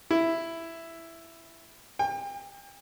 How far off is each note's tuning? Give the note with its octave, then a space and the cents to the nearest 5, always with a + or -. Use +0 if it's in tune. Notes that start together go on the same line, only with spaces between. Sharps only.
E4 +5
G5 +35